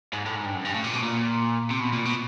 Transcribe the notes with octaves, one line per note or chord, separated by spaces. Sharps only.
G#2
A2
G#2
G2
F#2
G2
A2
A#2
B2
A#2
C3
B2
A#2
B2